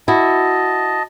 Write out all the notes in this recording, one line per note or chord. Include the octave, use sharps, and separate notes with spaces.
E4 F#4 D#5 A5